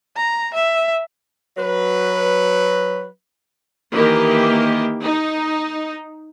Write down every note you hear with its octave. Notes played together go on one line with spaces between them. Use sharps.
A#5
E5
F#3 B4
D#3 E3 A#3 G4
D#4